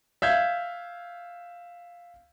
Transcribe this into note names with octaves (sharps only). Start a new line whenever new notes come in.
E5 F5 G6 G#6